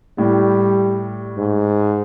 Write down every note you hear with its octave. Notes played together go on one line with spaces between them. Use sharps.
A2 G3
G#2